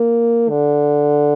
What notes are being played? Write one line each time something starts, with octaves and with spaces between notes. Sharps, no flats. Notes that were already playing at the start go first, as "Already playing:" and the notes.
Already playing: A#3
D3